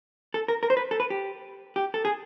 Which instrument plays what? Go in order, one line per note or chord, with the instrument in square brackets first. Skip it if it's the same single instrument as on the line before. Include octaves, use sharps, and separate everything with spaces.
[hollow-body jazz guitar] A4
A#4
A#4
C5
B4
A4
B4
G4
G4
A4
G#4